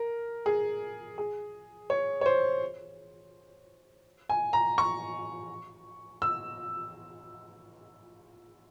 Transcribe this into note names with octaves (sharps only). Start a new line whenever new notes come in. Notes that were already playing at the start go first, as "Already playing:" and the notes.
Already playing: A#4
G#4
G#4
C#5
C#5
C5
G#5
A#5
C#6
E6